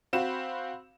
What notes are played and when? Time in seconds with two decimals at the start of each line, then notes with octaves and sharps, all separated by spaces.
0.13 C4 F#4 F5 B5 E7